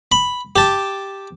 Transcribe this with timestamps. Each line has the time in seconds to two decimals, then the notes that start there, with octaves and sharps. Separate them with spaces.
0.12 B5
0.56 G4 A5